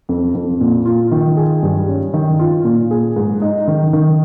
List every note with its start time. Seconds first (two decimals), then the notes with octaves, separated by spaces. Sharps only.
0.09 F2
0.35 F2
0.60 A#2
0.85 F4
1.11 D#3
1.37 G#4
1.63 G2
1.88 C#4
2.14 D#3
2.39 F4
2.65 A#2
2.91 G#4
3.16 G#2
3.42 D#4
3.68 D#3
3.93 D#3